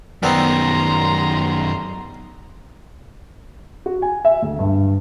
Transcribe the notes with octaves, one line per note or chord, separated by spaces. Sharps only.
F#2 D#3 G3 B3 C4 A#5 C6
F#4
G#5
E5
D2
G2